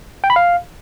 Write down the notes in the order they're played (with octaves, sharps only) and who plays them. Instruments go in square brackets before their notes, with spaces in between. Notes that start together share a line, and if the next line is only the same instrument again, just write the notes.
[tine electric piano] G5
B5
F5